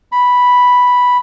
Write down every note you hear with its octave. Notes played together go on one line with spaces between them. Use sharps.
B5